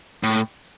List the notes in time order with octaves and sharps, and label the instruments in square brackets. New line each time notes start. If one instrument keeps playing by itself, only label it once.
[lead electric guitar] A2